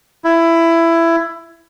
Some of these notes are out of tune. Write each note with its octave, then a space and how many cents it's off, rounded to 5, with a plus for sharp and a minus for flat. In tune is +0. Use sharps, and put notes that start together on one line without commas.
E4 +15